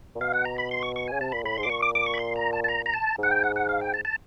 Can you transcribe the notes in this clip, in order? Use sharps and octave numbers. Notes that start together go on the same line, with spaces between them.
A#2
B2 F5
F#5
A#5
B5
C6
C#6
C#6
C#3 G#5
C3 A5
A#2 B5
A2 B5
G#2 C6
D6
B2
A#2 C#6
D6
D6
C#6
B5
C6
A#5
A5
A5
A#5
A#5
A5
G#2 F#5
G5
F#5
F#5
F5
G5
A5
A5